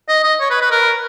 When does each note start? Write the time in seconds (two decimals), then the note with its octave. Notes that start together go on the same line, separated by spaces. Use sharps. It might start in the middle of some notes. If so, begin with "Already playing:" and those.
0.09 D#5
0.24 D#5
0.40 C#5
0.50 B4
0.61 B4
0.71 A#4